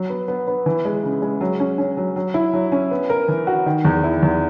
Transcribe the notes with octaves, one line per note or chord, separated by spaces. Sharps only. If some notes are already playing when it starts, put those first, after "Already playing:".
Already playing: F#3
B3
B3
B3
E3
G#3
C#3
G#3
F#3
C#4
C#4
F#3
F#3
E4
F#3
C#4
B3
A#4
E3
F#4
D#3
E2
E4
E2